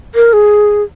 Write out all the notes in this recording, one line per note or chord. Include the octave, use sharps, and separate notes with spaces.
A#4
G#4